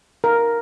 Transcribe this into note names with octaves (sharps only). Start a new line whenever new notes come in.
A#4